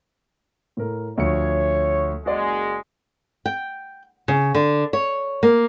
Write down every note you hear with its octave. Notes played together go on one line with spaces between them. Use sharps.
A2 A#4
D2 F3 C#5 C#7
F#1 G#3 F#4 D5
G5
C#3
D3
C#5
A#3